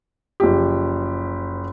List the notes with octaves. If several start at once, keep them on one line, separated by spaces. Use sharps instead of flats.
F#1 F3 G4